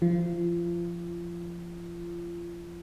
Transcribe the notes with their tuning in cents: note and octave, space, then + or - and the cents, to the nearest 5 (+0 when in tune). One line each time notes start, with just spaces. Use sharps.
F3 -15 F4 -30